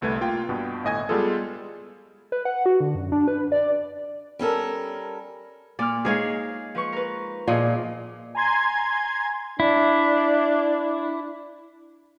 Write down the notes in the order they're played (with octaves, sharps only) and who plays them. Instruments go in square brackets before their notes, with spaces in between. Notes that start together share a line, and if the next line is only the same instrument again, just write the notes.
[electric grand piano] G1 C2 A3 B4 G#6
A#3 F4 G5
G2 B2 B3
G1 A2 D#5 G#5 G#6
G3 G#3 B3 F4 G#4 A4
[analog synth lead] B4
F#5
F#4
D3
F#2
D4
B4
D5
[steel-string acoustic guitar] G3 C#4 A4 A#4
[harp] A#2 F6 [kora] D5
[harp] G#3 D#4 [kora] G#4 C#5 F5
[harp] F3 B4 C#6
A#4 B4
[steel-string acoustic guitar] A#2 [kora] F3 [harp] G#4 D#5
[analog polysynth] G#5 A#5 C6 G#6
[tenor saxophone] D4 [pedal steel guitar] E4